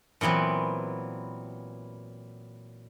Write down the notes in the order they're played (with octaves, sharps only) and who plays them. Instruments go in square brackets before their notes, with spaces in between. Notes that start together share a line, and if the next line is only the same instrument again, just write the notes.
[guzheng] A#2 E3 F#3 B3 C4